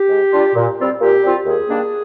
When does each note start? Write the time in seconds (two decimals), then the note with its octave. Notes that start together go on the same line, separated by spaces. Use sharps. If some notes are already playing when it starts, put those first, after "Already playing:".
Already playing: G4
0.09 G#2
0.32 G3 D4 F4
0.54 A#2
0.77 G3 C4 F4
1.00 A#2 G4
1.23 G3 C4 F4
1.45 D#2 G#4
1.68 D#3 G3 A#3 D4